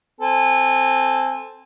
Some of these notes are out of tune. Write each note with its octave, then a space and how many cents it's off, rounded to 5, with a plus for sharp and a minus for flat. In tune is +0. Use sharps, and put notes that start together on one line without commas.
C4 +0 A4 +0 G#5 -25